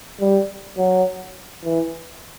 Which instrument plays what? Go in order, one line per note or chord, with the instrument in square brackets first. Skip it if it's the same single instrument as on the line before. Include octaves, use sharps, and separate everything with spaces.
[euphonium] G3
F#3
E3